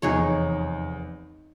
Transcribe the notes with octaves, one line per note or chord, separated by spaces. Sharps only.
F1 E2 D#4 G#4 C#5